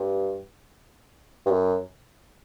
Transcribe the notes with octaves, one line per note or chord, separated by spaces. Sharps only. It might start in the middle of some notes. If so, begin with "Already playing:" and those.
Already playing: G2
G2
F#2